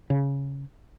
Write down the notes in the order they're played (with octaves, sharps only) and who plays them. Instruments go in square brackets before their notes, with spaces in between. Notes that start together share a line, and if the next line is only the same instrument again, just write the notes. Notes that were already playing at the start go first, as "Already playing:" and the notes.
[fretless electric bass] C#3